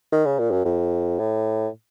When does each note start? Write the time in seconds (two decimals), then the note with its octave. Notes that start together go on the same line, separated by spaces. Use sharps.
0.12 D#3
0.26 C#3
0.39 A#2
0.52 F#2
0.65 F2
1.19 A2